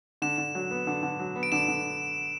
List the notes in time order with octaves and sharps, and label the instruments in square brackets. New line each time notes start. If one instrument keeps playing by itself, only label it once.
[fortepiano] D3 [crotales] E7
[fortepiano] D3
F#3
B3
D3
D3
F#3
B3
[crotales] D7
[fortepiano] D3 [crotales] E7
[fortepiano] D3